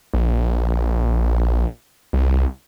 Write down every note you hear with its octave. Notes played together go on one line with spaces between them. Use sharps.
A#1
C2